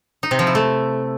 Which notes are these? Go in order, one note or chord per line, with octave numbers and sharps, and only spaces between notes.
D#4
C3
F3
E4
A3